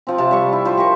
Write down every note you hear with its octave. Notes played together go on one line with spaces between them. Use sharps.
F3 C4
C3 A5
G3 C#6
E4
F3 C5
G4 A#4 C5 C#6